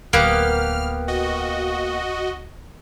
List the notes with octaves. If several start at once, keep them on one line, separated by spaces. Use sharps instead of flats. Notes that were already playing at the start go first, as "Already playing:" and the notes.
D1 A#3 B3 G4 F6
F#4 D#5